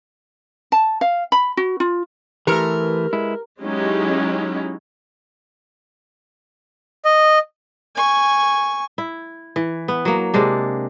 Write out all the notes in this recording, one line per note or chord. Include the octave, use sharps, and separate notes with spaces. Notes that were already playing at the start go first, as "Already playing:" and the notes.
A5
F5
B5
F#4
F4
E3 A3 G4 A#4 B4
G#3 E4
F#3 G#3 C#4 D#4 E4 G4
D#5
G#5 C#6
E4
E3
B3
F#3 A#3
C3 G#3 D4